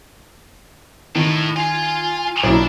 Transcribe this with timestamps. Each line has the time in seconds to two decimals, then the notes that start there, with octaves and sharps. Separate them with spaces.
1.15 A2 D#3
1.57 F4 G#5 C6
2.43 B1 A#2 D4 E4